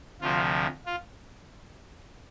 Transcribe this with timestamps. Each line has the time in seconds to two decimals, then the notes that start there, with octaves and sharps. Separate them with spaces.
0.21 D2 C3 F3 F4
0.86 F4